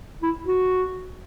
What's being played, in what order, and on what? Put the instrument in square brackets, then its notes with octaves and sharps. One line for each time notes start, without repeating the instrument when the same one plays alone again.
[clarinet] E4
F#4